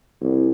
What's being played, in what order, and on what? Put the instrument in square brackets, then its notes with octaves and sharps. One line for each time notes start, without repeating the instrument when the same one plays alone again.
[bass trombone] C2